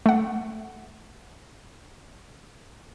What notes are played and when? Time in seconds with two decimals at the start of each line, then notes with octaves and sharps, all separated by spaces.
0.06 A3 F#5